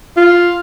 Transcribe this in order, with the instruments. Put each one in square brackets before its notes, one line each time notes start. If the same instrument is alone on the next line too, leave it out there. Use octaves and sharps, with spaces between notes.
[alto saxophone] F4